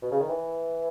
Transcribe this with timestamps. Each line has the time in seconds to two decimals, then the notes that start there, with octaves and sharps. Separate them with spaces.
0.02 B2
0.11 C#3
0.20 D#3
0.29 E3